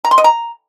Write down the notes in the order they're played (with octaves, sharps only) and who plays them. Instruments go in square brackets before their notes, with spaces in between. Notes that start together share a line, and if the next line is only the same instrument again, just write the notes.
[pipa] A#5
C6
D#5
A#5